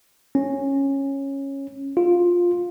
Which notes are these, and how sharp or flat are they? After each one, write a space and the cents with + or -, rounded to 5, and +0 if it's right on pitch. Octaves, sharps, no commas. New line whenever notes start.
C#4 -15
F4 +10